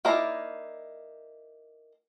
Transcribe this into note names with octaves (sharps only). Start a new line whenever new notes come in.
A#3 D#4 E4 D5 A#5